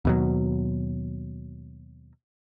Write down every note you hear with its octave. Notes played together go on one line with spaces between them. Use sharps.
D#2 B2 F#3